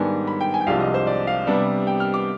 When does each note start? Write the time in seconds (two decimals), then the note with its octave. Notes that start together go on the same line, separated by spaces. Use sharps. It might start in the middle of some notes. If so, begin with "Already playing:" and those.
Already playing: G#2 D#3 G3 B3 D4 G#5
0.27 B5
0.41 G5
0.54 G#5
0.61 G5
0.67 C2 C3 F3 G#3 D4 F5
0.80 D#5
0.94 C5
1.07 D5
1.27 F5
1.47 C3 G3 B3 D4
1.87 G5
2.00 F6
2.14 D6